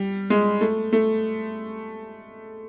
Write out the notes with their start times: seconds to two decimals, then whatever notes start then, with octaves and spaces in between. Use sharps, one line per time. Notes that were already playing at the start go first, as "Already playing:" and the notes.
Already playing: G3
0.30 G#3
0.61 A3
0.93 A3